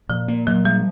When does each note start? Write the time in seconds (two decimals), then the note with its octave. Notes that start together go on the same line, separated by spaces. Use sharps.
0.09 A#2 F3
0.28 A#3
0.47 A#2 F#3
0.65 F3 G3